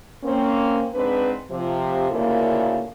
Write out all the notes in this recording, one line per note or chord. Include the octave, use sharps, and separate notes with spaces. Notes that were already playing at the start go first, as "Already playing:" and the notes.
A#3 C4 C#4
G#2 C4 D4 B4
C3 F3
D2 A#2 C#3 A#3 E4 A4